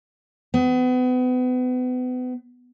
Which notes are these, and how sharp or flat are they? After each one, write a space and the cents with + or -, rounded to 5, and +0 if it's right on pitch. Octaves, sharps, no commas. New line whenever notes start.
B3 +35